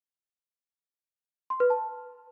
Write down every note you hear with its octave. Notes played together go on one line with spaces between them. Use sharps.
C6
B4
A5